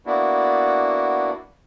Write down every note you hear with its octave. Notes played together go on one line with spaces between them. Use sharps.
A#3 B3 D4 E4 F#4